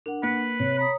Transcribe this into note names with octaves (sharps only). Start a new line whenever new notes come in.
D4 A#4 F#5
A#3 B4 C#7
C3 C#5
C#5 A#5 B5 D#6